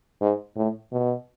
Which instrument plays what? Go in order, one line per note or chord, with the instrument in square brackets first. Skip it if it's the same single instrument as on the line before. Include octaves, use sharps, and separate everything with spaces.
[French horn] G#2
A2
B2